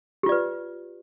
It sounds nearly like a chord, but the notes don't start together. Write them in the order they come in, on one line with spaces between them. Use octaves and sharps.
G4 F4 D5 B4